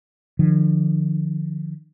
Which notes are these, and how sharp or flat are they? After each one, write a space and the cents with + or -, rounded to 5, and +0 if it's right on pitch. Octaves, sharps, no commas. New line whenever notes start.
D3 +40 F3 +0